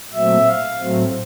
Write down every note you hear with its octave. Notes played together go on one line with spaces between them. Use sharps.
A#2 F#3 A3 C4 E5
F5
A2 F#3 A3 C4